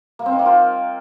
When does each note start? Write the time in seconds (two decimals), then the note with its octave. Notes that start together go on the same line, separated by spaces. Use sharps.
0.19 A#3
0.26 C4
0.32 D#3
0.39 A#3
0.46 F4